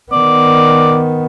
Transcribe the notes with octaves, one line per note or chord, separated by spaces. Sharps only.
D#3 B3 D5